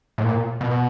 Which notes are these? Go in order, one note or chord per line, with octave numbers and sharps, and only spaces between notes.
A2
A#2
B2